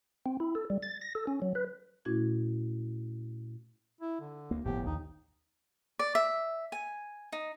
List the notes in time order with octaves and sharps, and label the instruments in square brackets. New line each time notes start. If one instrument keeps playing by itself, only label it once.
[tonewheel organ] C4
E4
A4
G3
A6
A#6
A4
C#4
F#3
B4
[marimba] A#2 A3 C#4 E4 F#4 G#6
[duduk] E4
D3
[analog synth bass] D2 [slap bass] A#3
[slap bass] G1 F3 B3 [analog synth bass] A2 [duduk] G4
[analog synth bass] A#1 [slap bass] D#2 [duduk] D#4
[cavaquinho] D5
E5
G#5
D#4